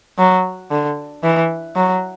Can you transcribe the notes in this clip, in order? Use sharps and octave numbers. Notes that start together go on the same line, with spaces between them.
F#3
D3
E3
F#3